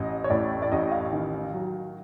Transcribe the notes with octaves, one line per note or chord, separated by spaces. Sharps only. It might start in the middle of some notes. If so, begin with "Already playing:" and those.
Already playing: A1 D#5
C#5
A2 D5
D5
A1 D#5
F5
D#3
F#3